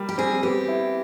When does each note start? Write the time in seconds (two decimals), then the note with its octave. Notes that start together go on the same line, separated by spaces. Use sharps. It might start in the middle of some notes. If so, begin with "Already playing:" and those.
Already playing: G3 A#3
0.09 G4
0.18 C4 G#4
0.43 B3 G4
0.68 E4